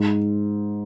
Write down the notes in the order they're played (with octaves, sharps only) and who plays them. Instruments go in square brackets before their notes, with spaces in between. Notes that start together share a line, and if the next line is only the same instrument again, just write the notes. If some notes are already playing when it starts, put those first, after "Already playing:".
Already playing: [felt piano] G#2